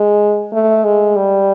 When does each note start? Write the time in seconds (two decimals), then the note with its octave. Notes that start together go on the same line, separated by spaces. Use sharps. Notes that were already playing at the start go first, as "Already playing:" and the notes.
Already playing: G#3
0.52 A3
0.84 G#3
1.16 G3